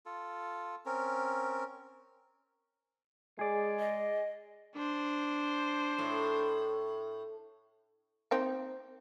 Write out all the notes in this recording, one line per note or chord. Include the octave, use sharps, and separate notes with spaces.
F4 A4
C4 C#4 A#4
G#3 G#4 D5
D#5
D4 C5
A2
A#3 C4 D#4